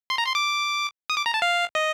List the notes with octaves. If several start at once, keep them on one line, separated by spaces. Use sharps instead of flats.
C6
A#5
C6
D6
D#6
D6
A#5
A5
F5
D#5